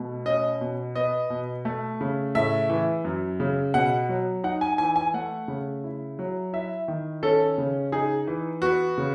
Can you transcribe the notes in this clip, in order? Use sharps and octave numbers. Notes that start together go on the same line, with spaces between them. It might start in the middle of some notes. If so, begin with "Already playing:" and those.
Already playing: B2 A3
C#4 D#5
B2
B3 D#5
B2
A3
C#3
A2 E5
E3
F#2
C#3
B2 F#5
F#3
D#4 F#5
G#5
E3 G#5
G#5
A3 F#5
C#3
E4
F#3
E4 E5
D#3
C#4 A4
C#3
D#4 G#4
E3
B3 F#4
C#3